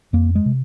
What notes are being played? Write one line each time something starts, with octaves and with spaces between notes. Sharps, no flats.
F2 A#3
G#3
C3